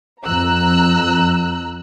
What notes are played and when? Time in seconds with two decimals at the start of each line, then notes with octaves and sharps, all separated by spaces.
0.25 F2 A#5 E6 F#6